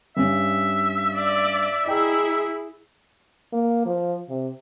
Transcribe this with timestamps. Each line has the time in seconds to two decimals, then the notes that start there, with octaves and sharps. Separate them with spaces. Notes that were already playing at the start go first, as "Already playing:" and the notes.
0.17 G2 G3 C#4 E5
1.16 D5
1.86 E4 G#4 D#5 G5 A#5
3.53 A#3
3.86 F3
4.29 C3